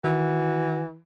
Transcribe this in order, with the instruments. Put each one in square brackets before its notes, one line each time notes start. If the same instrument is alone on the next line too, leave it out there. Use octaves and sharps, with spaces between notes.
[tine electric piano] D#3 [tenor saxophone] E3 [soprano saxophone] F#4